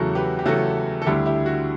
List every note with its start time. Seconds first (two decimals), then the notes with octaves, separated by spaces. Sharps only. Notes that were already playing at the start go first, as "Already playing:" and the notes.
Already playing: E2 C#3 F#3 A3 F#4 A4
0.15 G4 B4
0.39 G4
0.46 E2 C#3 F#3 A3 F#4 A4
1.02 A4
1.06 D2 D3 G3 E4 G4
1.26 E4 G4
1.46 F#4